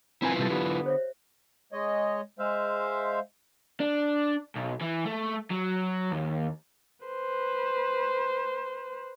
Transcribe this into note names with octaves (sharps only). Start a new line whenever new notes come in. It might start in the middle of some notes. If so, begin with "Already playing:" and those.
C4 E4 F4 A#4 B4 G#5
C3 G3 A4
D3 B3 G4
C5 C#5 E5
G#3 C#5 D#5
G#3 C5 E5 F5
D4
B1
E3
A3
F#3
D#2
B4 C5